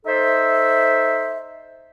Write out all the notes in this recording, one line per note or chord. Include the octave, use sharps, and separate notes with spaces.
D#4 A4 C5 E5